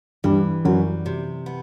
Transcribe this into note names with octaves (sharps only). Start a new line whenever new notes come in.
G2 E3 G3
F#2 F#3 G3
C3
B3